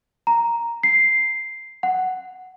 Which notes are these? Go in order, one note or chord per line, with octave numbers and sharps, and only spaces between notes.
A#5
C7
F#5